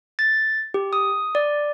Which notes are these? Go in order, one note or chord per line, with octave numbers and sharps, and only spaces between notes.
A6
G4
D#6
D5